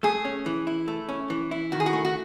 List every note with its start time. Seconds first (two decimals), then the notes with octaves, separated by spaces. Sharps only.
0.03 A3 G#4
0.25 C#4
0.46 E3
0.67 E4
0.88 A3
1.09 C#4
1.30 E3
1.51 E4
1.72 D#3 F#4
1.80 G#4
1.86 F#4
1.93 A3
2.05 F#4